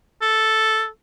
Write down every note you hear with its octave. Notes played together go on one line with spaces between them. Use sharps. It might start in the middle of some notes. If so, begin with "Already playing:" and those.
A4